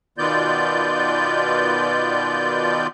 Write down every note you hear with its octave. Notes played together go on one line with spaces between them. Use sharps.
B2 D#3 B3 F4 D5 G6